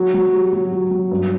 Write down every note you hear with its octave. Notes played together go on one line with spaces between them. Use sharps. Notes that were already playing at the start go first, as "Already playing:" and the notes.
Already playing: F#3
F#3
G4
F#3
F#3
F#3
G2